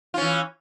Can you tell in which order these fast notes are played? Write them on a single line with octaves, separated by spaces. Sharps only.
F4 C#4 E3